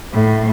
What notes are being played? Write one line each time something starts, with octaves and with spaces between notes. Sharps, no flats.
A2